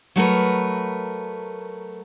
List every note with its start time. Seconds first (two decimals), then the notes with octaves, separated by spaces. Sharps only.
0.16 F#3 A3 A#4 B4